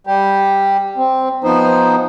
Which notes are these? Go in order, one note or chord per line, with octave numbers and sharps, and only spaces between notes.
G3 G4
C4
F3 B3 D#4 C5